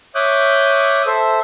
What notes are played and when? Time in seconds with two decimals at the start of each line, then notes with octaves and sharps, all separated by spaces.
0.15 C#5 E5 D6 D#6 F#6 G6
1.06 A4 C5 E5